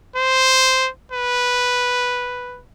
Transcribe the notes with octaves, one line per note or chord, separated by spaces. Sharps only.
C5
B4